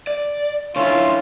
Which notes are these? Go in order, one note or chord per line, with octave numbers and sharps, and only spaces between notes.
D5
D3 C#4 E4 F4